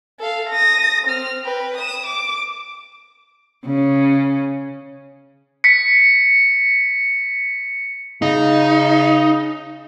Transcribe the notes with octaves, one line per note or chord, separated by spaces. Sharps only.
A4 F5
D#6 A#6
C4 F6
B4 G5
D#6 E7
D6
C#3 C#4
B6 C#7
C#3 D#4